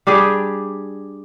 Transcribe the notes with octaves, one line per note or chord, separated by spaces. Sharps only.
G3 D4 G4 G#4